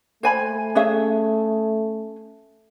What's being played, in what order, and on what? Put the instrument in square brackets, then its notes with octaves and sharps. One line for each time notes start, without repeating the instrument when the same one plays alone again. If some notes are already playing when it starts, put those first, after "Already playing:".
[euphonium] A3 [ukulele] C5 G#5 B5
[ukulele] C#4 G#4 E5